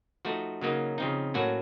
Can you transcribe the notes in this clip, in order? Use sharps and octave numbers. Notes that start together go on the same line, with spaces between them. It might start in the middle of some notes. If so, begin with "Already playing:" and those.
F3 A3 D#4 F#4
C#3 F#3 A#3 D#4
C#3 F3 C4 D#4
A2 F#3 A#3 C#4 F#4